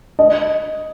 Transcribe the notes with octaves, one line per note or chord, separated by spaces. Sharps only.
D#5